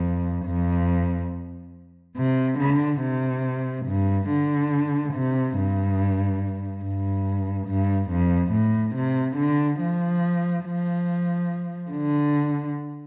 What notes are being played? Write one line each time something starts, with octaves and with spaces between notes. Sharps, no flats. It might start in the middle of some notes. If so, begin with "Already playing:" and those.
Already playing: F2
F2
C3
D3
C3
G2
D3
C3
G2
G2
G2
F2
A2
C3
D3
F3
F3
D3